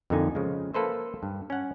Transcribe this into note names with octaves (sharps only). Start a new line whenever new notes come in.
F2 A#2 D3 D#4 G#5
C#3 F3 G#3
A#3 A4 B4 C5 E5
G2
C#4 F#5